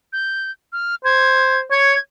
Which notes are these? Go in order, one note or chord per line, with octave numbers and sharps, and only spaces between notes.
G6
F6
C5 G#6
C#5 G#6